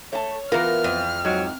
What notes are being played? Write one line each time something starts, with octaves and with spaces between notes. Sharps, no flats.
A3 C#5 A5
E3 B3 F4 A#4 F6
F2
G#2 F#3